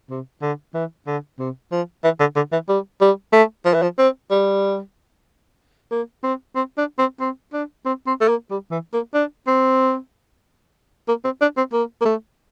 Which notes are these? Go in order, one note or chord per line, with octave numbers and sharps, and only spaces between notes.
C3
D3
E3
D3
C3
F3
E3
D3
D3
E3
G3
G3
A3
F3
E3
F3
C4
G3
A#3
C4
C4
D4
C4
C4
D4
C4
C4
A3
A#3
G3
E3
A#3
D4
C4
A#3
C4
D4
C4
A#3
A#3
A3